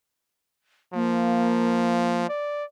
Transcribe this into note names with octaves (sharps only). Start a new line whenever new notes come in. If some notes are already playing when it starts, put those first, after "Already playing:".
F3 A#3
D5